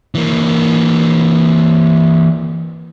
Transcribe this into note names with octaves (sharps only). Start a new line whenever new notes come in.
E3 A#3